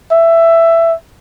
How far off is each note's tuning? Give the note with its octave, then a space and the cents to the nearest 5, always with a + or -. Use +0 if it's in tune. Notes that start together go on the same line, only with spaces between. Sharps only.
E5 +10